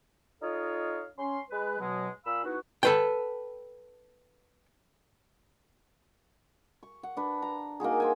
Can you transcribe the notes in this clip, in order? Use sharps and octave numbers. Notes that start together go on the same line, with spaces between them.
D#4 F4 A4 C#5 D#5 F5
C#4 C6
G#3 B4
B2 F#3 G#3
A#2 F5 B5 E6
B3 D#4 E4 F#4
A4 B4 G5
C#6
F#5
D4 B4
A#5
A#3 D#4 F#4 G#4
C5 G5 G#5